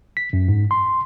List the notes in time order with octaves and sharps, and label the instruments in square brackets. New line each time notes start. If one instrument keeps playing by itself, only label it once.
[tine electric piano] B6
F#2
G#2
C6